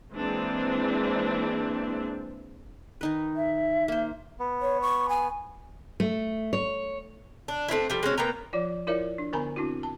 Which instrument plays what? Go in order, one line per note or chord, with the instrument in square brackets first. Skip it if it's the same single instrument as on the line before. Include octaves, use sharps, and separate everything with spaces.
[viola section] E3 G#3 A#3 C4 D4
[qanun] D#3 D#4 B4
[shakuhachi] E5
[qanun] A#3 C5
[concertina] B3
[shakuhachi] C#5
C#6
G#5
[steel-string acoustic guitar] A3
C#5
[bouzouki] D4
A3 C4 D4 E4
F3 G3
G#3 C4 C#4 F#4
A#3 B3 G5 A#5
[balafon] F3 F4 C#5 D5
E4 F4 A#4 C#5 D5 E5
D4
D3 B3 A#4 G#5 A#5 B5
C4 D4 E4 F#4
A5